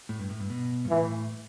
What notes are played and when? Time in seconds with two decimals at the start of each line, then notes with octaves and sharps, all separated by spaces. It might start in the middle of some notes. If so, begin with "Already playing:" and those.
0.09 A2
0.19 G2
0.30 A2
0.40 G2
0.50 B2
0.85 G2
0.90 A2 E3